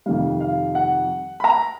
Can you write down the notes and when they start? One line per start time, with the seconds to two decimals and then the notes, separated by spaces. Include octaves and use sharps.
0.06 F2 C3 D#3 G3 F5
0.40 F5
0.75 F#5
1.40 B5
1.44 A#5